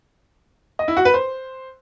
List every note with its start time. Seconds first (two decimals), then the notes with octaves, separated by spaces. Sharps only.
0.79 D#5
0.88 E4
0.97 F#4
1.05 B4
1.14 C5